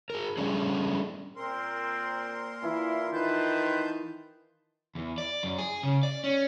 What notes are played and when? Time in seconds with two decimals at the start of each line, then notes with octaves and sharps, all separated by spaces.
0.10 G#4 A#4
0.37 G3 A3 C#4 D4 G#4
1.36 A#2 C4 A#4 C6
2.63 E3 E4 F4
3.13 D#3 B4 A5 C6 G6
4.95 E2
5.18 D5
5.43 F#2
5.58 G#4
5.83 C#3
6.03 D5
6.24 C#4